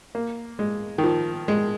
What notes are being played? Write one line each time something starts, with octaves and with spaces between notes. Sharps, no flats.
A#3
G#3
D#3
F3
G#3